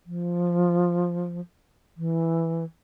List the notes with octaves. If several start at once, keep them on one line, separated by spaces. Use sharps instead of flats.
F3
E3